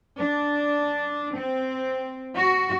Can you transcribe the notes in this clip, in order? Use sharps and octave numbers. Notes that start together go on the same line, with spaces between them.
D4
C4
F#4